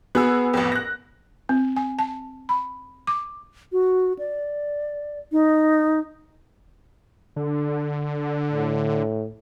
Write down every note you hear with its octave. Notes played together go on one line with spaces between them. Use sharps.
B3 F#4 G#4 E6
A1 F2
F#6 A#6
C4
G#5
A5
B5
D6
F#4
D5
D#4
D3
A2